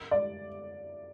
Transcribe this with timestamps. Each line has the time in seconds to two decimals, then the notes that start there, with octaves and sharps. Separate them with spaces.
0.11 D5